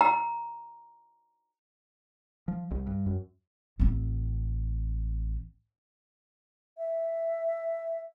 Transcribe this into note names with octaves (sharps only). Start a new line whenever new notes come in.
A#5
F3
C2
G2
F#2
A1 C4
E5